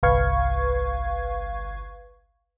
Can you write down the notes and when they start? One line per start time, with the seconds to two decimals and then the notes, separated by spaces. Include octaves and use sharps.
0.03 G1 C2 B4 F5 C#6 G#6